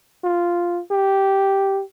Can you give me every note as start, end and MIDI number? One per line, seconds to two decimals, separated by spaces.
0.24 0.81 65
0.91 1.82 67